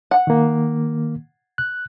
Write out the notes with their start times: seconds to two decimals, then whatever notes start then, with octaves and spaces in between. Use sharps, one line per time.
0.11 F#5
0.27 D#3 A#3
1.58 F#6